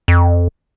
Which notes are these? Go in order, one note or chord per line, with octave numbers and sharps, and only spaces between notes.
F2